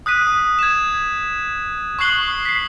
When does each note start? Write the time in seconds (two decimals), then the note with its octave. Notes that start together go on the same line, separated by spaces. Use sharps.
0.06 D#6 F#6 B6 D#7
0.27 D#6
0.59 G#6 E7
1.99 C#6 D#6 F#6 C7 F#7 G7
2.45 B6 C7